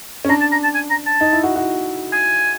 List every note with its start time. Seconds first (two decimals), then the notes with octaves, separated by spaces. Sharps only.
0.25 C#4
0.29 D4 A#5
0.41 A5
0.52 A#5
0.63 A5
0.75 G#5
0.90 A#5
1.06 A5
1.21 D#4
1.33 E4
1.43 F#4
1.56 F#4
2.12 G#5